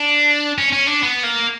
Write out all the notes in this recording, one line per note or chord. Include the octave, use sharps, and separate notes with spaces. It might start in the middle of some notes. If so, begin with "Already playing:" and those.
Already playing: D4
C#4
C#4
D4
B3
A#3